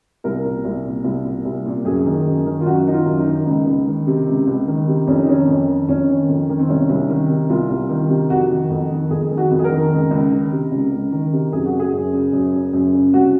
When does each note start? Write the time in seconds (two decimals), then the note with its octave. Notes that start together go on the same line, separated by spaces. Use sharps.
0.24 C2 A#4
0.45 A#2
0.65 C2
0.85 A#2
1.04 C2
1.24 A#2
1.45 C2
1.66 A#2
1.85 F#2 G#4
2.06 D#3
2.26 F#2
2.46 D#3
2.61 F4
2.66 F#2 F#4
2.86 D#3 D#4
2.93 F4
3.06 F#2
3.19 D#4
3.27 D#3
3.46 C#2
3.66 C#2
3.87 D#3
4.07 C3
4.27 C#2
4.47 C#2
4.67 D#3
4.88 C3
5.07 F2 C#4
5.18 D#4
5.27 D#3 C#4
5.47 F2
5.68 D#3
5.88 F2 C#4
6.08 D#3
6.29 F2
6.49 D#3
6.59 C4
6.69 C2 C#4
6.89 C2
7.09 D#3
7.29 C3
7.49 C2 F4
7.70 C2
7.89 D#3
8.09 C3
8.30 F2 F#4
8.50 D#3
8.70 F2
8.90 D#3
9.10 F2 G#4
9.31 D#3
9.38 F#4
9.51 F2
9.59 G#4
9.64 A#4
9.71 D#3
9.91 C#2
10.11 C#2
10.31 D#3
10.52 C3
10.72 C#2
10.92 C#2
11.12 D#3
11.33 C3
11.52 F#2 G#4
11.66 F#4
11.73 C#3
11.79 G#4
11.93 F#2
12.13 C#3
12.33 F#2
12.53 C#3
12.73 F#2
12.93 C#3
13.13 C2 F#4